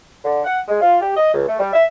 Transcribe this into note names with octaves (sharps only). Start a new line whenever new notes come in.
D3
F#5
G#3
F4
G4
D#5
C#2
A3
G3
E5